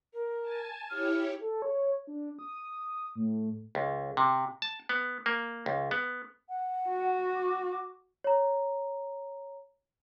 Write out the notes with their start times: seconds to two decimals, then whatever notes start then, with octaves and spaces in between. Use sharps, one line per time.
0.13 A#4
0.42 G#5 A5
0.90 E4 G4 C#5 F6
1.41 A4
1.62 C#5
2.07 D4
2.39 D#6
3.15 A2
3.75 C#2
4.17 C3
4.62 A5
4.89 B3
5.26 A#3
5.66 C#2
5.91 B3
6.49 F#5
6.89 F#4
7.35 D6
8.24 C#5 A#5